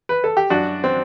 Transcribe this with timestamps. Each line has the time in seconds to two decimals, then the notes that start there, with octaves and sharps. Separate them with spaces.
0.09 B4
0.24 A4
0.37 G4
0.50 F#2 D4 F#4
0.84 C4